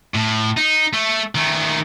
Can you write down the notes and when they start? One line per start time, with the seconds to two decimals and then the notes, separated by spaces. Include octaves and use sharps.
0.15 A2
0.57 D#4
0.93 A3
1.35 D#3 A3